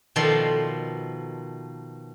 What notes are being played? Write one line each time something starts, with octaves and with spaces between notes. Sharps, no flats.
B2 D#3 F3 A4 D5 C6